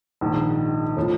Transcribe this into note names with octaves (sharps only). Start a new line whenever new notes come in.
A#1 G#2 D#3
A2 F3